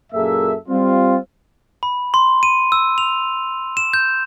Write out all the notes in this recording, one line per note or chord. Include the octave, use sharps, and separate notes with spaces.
F#2 A#2 A#3 G#4 A4 E5
G3 C4 F4
B5
C6
D#7
E6
F7
E7
G6